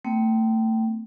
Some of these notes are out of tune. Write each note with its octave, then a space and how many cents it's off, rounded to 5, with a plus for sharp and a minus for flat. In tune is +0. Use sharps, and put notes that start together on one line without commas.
A3 +25 C4 -35 G5 -20